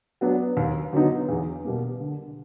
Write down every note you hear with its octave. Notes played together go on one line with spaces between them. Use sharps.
F#3 B3 D4
D#2
D3 F#3 B3 D#4
E2
B2 G3 A#3
D3